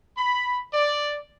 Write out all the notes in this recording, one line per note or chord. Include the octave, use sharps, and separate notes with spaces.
B5
D5